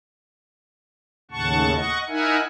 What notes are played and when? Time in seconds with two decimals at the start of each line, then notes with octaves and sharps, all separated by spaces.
1.31 D#2 A2 C#3 F#5 A5 C#6
1.74 D#5 F#5 C#6
2.08 D#4 E4 A#4 E5 F#5 G#5